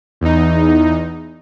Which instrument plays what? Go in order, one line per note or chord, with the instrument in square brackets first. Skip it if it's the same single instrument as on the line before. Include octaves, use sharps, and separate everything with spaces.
[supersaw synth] E2 D#4